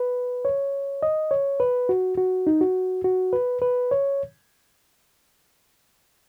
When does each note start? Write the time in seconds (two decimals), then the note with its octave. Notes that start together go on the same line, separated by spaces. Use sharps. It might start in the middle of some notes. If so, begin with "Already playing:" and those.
Already playing: B4
0.45 C#5
1.03 D#5
1.31 C#5
1.60 B4
1.89 F#4
2.17 F#4
2.47 D#4
2.61 F#4
3.04 F#4
3.33 B4
3.62 B4
3.91 C#5